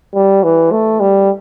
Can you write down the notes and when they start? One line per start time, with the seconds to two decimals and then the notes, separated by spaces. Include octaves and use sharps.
0.15 G3
0.44 E3
0.72 A3
1.00 G3